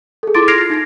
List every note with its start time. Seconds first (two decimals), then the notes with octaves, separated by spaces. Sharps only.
0.23 G#4 A4
0.34 E4 F4 C6 D6 A6 D7
0.48 F6 G#6 A#6 C7 D7 F7
0.70 D#4 G#6 A#6